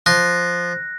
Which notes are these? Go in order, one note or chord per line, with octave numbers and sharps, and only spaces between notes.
F3 F#6 A#6